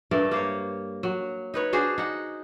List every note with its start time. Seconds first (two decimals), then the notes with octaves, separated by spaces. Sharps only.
0.11 G2 A3 A#4 D5
0.31 A#3 C5 C#5
1.03 F#3
1.54 D#4 B4 C#5
1.73 D4 F#4 G#4 C5
1.98 D#4 F#5